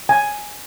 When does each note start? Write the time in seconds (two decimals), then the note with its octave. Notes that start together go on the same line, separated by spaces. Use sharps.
0.09 G#5